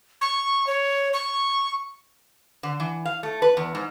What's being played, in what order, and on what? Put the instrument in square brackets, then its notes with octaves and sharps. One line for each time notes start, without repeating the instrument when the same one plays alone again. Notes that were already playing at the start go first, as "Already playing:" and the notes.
[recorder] C#6
C#5
C#6
[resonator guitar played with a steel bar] D3
E3
F5
A3
B4
E2
G#2